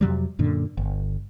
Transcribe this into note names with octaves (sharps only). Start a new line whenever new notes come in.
F2 C3 F#3 G3
F#2 A#2 D3
G1